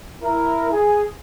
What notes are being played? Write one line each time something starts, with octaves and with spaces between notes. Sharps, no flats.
E4 A#4
G#4